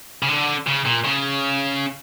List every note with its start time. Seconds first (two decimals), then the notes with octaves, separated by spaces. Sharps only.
0.22 C#3
0.28 D3
0.67 C#3
0.86 A#2
1.05 C#3